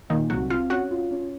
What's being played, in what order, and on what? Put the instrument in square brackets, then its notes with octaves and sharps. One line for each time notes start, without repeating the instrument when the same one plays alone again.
[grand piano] A#2 [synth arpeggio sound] D#3 D#4
[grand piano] C2 [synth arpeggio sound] F#3 F#4
[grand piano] C4 [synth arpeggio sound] F4 F5
[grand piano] C#4 [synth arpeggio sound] F#4 F#5
[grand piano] F4
C#4